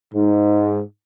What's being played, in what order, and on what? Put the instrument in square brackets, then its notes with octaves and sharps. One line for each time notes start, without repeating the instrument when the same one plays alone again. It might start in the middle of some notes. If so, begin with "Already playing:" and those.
[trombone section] G#2